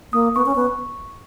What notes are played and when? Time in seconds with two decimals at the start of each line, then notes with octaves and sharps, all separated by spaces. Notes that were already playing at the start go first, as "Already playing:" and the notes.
0.13 A#3 D#6
0.35 B3 C#6
0.46 C#4
0.55 B3